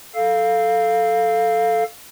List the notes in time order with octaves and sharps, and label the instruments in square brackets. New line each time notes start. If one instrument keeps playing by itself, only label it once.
[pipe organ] A4 F5